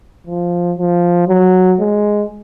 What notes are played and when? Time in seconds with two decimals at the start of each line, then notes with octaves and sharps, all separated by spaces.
0.27 F3
0.78 F3
1.28 F#3
1.80 G#3